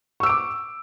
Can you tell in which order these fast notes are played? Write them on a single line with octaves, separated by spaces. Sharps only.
C#6 E6 D7 D6